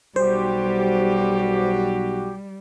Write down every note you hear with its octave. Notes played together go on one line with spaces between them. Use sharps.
B1 G3 F#4 G4 C5